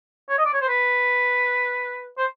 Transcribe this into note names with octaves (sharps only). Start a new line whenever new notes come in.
C#5
D#5
D5
C#5
C5
B4
C5